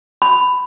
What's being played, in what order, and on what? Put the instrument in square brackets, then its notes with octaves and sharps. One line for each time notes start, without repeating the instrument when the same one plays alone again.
[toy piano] B5